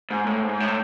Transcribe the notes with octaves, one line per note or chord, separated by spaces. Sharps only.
G#2
A2
G#2
A2